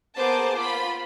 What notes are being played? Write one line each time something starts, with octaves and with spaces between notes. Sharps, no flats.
A#3 B3 G#4 C5 A5 D6
F4 B5